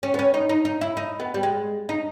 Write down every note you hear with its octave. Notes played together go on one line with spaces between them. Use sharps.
C#4
B3
C#4
D#4
D#4
D#4
E4
D#4
B3
G3
G#3
D#4